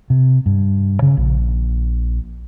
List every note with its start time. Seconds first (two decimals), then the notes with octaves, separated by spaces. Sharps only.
0.10 C3
0.46 G2
1.02 C#3
1.17 A#1